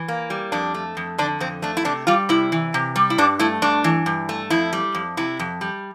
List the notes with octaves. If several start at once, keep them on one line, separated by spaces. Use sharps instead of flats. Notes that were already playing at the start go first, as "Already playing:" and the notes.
Already playing: E3
A#3
G3
F2 D4
A3
F2
D3 D4
F2 C4
A3 D4
E4
C3 D4
G3 F4
C3 E4
E3
C3
G3
E4
G2 D4
A3 E4
G2 D4
E3
G2
A3
F2 E4
G3
F2
C3 E4
F2
G3